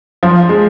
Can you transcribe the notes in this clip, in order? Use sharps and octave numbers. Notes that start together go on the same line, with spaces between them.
F3
G#3